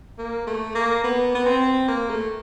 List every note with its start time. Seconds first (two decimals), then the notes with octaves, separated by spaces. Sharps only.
0.18 A#3
0.47 A3
0.75 A#3
1.04 B3
1.35 B3
1.46 C4
1.88 A#3
2.10 A3